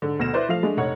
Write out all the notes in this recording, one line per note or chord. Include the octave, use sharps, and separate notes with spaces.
G#2 D3
D2 B2 A#6 E7
E4 B4 C5 D5
F3 A3 F5 F7
G#3 A3 D4
F1 D#4 C#5 F#5